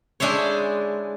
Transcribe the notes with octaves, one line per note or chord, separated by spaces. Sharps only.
G#3 D4 E4 C5 C#5